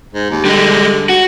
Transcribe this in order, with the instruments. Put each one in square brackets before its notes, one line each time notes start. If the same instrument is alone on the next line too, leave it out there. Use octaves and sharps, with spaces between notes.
[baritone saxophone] G#2
D#2
[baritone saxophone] D3 [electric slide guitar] G3 G#3
[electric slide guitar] F#4